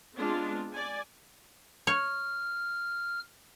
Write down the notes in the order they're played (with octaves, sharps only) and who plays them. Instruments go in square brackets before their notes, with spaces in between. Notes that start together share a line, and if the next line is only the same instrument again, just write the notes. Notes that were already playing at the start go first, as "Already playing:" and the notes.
[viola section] G#3 B3 C4 D4 F4
D5 G#5
[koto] C#5 [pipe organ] F6